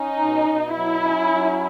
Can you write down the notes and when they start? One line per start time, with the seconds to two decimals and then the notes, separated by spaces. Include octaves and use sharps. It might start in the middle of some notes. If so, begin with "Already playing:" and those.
Already playing: C#4 D#4
0.22 B2
0.49 B2
0.76 F#3 E4
1.04 C#4
1.32 F#3